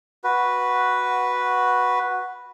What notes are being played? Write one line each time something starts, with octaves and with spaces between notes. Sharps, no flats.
F#4 B4